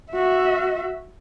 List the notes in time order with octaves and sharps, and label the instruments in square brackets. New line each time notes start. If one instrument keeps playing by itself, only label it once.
[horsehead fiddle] F#4 E5